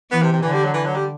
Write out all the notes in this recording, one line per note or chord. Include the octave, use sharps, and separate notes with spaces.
E3 B3
C3
C3
D3 E3
G3
F#3
E3
F#3
G3